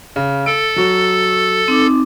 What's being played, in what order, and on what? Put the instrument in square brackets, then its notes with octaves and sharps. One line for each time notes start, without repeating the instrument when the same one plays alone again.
[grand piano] C#3
[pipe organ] A4 [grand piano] D7
[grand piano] F#3 F#4
[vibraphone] C4 D#4 D6